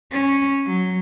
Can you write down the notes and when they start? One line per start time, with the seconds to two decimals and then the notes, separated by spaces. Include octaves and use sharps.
0.12 C#4
0.66 F#3